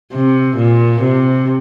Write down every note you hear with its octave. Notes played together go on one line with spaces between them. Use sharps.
C3
A#2
C3